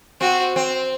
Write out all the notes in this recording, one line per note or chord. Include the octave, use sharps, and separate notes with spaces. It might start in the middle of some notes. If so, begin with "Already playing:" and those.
C4 F#4
C4